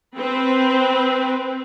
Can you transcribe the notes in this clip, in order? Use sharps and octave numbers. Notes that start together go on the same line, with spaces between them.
C4 B4